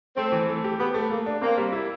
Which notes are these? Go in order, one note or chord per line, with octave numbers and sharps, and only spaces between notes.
A3 C4
E3
A3
G4
B3 G4
A3
A3 A#3
D4
A#3 C4
G3
E4